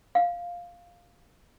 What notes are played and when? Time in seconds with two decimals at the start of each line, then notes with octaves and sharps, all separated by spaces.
0.15 F5